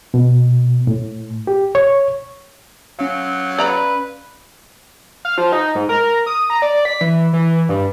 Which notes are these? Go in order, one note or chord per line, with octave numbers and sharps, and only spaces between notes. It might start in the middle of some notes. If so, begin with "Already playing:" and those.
B2
A2
G4
C#5
F#3 C#4 F5
B4 D5 A#5 B5
F5
F3
D#4
G#2
A#4
D#6
A#5
D5
B6
E3
E3
G2